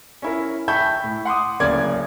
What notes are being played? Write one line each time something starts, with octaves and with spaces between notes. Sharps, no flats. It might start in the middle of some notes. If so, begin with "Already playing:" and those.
C#4 E4 A#4
E5 G5 A5 B5 C#6 G6
A2
F#5 C6 D6 D#6
D1 C#3 A#3 D5 G#6